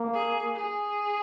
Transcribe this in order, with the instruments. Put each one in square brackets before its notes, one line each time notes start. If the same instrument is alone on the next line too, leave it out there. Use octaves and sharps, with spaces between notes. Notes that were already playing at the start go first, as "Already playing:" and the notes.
Already playing: [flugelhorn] A#3
[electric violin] G#4
G#4